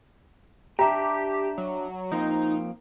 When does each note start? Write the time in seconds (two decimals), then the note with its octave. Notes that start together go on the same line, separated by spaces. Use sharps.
0.79 D4 G4 E5 G5 A#5
1.58 F#3
2.12 F3 A#3 C4 D#4